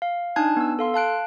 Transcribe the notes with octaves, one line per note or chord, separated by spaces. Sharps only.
F5
D4 D#4 G#5 A5 F#6 G#6
B3 E6
A4 F5 C6
F5 A5 F#6 D7